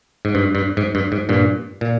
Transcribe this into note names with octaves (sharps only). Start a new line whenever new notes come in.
G#2
G2
G2
G#2
G2
G#2
G2 A#2
A#2